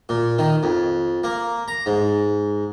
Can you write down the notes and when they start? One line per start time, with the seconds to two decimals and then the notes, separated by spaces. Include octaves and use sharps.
0.09 A#2
0.38 D#3
0.63 F2
1.24 A#3
1.68 A#5
1.86 G#2